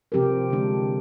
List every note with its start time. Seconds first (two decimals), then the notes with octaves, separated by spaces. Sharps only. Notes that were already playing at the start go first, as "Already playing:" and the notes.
0.12 C3 F3 C4 G4 A#4
0.50 D3 G#3 D4